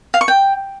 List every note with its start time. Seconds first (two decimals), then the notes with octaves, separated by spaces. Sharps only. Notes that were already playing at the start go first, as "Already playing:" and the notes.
0.14 F5
0.21 C#6
0.28 G5